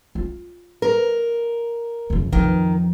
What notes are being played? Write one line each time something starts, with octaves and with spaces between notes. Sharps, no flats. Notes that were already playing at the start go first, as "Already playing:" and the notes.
F4
A#4
F2 C#3
F2 D#3 F3